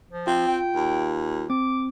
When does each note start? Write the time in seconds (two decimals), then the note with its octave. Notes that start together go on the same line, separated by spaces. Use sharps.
0.11 F3
0.27 C4 F4
0.48 G5
0.75 D#2
1.50 C4 D6